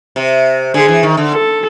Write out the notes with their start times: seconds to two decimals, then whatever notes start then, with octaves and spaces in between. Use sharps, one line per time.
0.16 C3
0.74 D3 G#4
0.88 E3
1.03 D#3
1.17 D3
1.33 A4